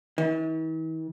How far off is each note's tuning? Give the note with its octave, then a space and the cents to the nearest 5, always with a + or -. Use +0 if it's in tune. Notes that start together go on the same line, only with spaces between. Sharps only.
E3 -45